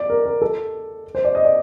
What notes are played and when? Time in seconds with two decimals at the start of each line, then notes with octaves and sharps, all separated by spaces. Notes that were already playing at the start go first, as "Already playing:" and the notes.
Already playing: D5
0.10 A#4
0.26 A#4
0.42 A4
1.15 C5
1.25 D5
1.35 D#5
1.45 D5